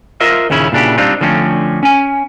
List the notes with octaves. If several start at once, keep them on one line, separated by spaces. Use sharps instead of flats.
F4 A#4 C5 D#5 E5
D#2 A#2 C#3 C#4 E4
A#2 C#3 D4 E4 G4
G3 C4 D4 D#4 F4
D3 F3 A3 C4 C#4
C#4 G#5